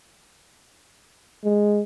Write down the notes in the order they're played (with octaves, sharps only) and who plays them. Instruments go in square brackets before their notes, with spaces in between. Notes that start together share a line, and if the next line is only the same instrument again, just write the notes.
[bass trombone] G#3